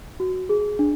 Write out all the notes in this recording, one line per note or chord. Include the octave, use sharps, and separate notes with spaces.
F#4
G#4
D4